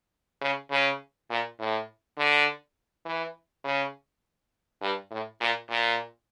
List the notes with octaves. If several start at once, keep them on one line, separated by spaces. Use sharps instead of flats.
C#3
C#3
A#2
A2
D3
E3
C#3
G2
A2
A#2
A#2